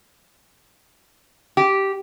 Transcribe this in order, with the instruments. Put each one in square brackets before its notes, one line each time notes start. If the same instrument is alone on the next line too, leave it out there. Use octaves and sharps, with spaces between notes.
[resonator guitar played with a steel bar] G4